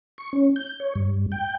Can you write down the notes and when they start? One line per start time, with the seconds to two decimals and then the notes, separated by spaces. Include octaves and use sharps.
0.18 C#6
0.33 C#4
0.56 G6
0.80 C#5
0.95 G2
1.32 G5